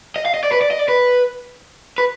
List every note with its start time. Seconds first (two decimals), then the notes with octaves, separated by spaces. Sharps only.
0.16 D#5
0.26 F5
0.34 D#5
0.43 D5
0.52 B4
0.61 D5
0.71 D#5
0.79 D5
0.88 B4
1.98 B4